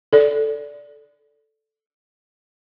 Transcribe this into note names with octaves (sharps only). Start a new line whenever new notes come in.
A4 D5